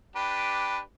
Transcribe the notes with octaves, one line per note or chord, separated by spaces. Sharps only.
D4 G4 B4